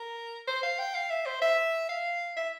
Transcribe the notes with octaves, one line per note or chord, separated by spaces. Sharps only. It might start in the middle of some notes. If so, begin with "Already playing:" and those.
Already playing: A#4
C5
F5
G5
F5
E5
C5
E5
F5
E5